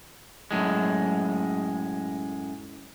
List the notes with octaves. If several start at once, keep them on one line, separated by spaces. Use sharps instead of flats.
F#2 A2 G#3